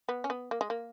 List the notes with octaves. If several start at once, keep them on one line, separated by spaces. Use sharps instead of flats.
B3
C#4
B3
A#3
G#3
A#3